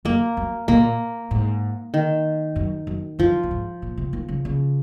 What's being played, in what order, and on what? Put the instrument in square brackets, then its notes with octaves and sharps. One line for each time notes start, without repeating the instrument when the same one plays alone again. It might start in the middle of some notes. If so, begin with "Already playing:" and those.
[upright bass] F#2 [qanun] A#3
[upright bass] F#2
[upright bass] A#2 [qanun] A#3
[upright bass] G#2
[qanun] D#3
[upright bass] F#2
F#2
[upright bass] F#2 [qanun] F3
[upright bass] A#2
G#2
A#2
C3
D#3
C#3
C#3